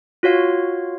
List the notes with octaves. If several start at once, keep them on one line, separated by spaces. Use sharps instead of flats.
F4 F#4 C#5 F5